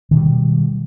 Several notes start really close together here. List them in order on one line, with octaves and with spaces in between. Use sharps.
D#3 B2 G3 F#3